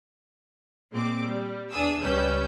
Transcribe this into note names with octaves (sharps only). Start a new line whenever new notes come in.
A#2 G#3 C4 D6
G3
E2 D4 G#4 D#6 E6
C#2 G3 C#4 B4 E6 G6